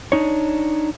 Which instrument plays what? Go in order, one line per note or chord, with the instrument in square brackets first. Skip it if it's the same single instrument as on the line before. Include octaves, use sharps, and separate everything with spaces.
[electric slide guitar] D4 D#4 C#5